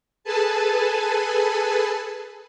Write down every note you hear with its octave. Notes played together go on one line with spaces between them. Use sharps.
G#4 A4 B4 G#5 A5